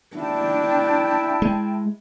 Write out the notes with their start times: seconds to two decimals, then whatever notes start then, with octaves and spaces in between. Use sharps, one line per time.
0.17 D4 E4 G5 A5
1.42 G#3